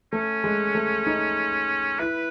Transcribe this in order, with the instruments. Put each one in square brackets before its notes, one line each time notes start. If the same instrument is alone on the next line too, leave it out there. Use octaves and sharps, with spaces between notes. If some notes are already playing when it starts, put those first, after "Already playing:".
[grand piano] A3 [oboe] C#4
[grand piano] G#3
A3
D#4
[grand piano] E4 [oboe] B4